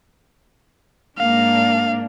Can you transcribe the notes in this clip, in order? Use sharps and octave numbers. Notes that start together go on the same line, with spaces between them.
G#2 A#3 D4 F5